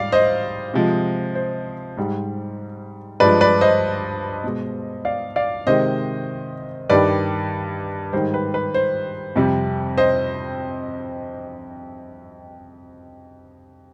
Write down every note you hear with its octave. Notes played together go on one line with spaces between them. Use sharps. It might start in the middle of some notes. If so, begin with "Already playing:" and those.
Already playing: G#2 G3 D5 F5
C5 D#5
C3 F3 G#3
C5
G#2 G3
G2 F3 G#3 B4 D5
B4 D5
C5 D#5
B2 G#3
D5 F5
D5 F5
C3 D#3 G#3 C5 D#5
G2 D#3 G3 B4 D5
G#2 D#3 G3 C5
B4
B4
C5
F2 C3 G3
C5 D#5